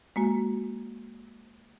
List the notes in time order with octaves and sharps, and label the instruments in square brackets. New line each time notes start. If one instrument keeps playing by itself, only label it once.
[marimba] G#3 A#3 F#4